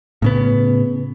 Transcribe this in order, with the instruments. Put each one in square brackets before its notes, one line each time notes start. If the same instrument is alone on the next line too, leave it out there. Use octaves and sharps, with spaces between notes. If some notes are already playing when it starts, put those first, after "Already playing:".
[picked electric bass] A2 C#3 B3